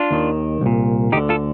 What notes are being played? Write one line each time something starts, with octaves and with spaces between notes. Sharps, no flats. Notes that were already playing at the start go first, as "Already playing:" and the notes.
Already playing: D4 F4
D#2 D#3
C2 A#2
D2 D3 D#4 G4
F4 A4